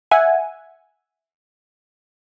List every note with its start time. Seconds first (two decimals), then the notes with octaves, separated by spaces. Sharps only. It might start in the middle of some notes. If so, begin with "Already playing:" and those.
0.11 E5 F#5 G#5